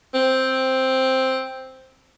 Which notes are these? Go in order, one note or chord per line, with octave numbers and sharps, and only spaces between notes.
C4